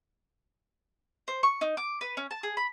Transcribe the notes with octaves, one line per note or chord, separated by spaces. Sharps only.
C5
C#6
D#4
D6
B4
C#4
A5
G#4
B5